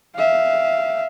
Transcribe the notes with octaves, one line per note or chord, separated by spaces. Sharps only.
E5 F5